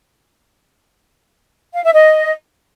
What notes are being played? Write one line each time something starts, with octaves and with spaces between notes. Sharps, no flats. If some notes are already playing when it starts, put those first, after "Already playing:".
F5
E5
D#5